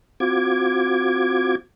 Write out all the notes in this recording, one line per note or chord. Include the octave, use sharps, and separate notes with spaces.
C4 F4 F#4 D6 G#6